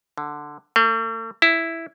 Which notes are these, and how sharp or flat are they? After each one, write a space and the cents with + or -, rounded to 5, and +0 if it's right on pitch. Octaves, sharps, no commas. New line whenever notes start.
D3 +10
A3 +45
E4 +0